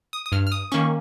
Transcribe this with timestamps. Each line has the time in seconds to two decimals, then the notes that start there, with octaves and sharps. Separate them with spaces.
0.13 D#6
0.26 D#6
0.32 G2 F6
0.47 F6
0.52 D#6
0.72 D#3 A#3 C#4 C#6